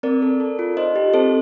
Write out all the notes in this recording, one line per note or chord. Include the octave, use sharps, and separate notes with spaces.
C4 A#4 D5
A4
A4
F4
D#4 C5 D#5
G4
C4 A4 C5